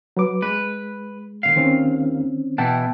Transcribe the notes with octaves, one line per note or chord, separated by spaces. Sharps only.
F#3 B4 D6
G#3 B4
D#2 B2 F5
D#3 C4 C#4
B2 E3 E4 F#5 G5 A5